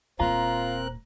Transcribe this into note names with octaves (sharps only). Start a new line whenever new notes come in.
D#1 A#2 C4 F4 A#4 A#5 F#6